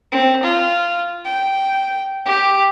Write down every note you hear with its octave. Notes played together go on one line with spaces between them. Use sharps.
C4
F4
G5
G4